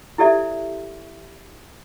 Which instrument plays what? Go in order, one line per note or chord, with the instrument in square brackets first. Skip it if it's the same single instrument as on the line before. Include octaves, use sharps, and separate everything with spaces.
[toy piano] E4 G4 A4 D5 E5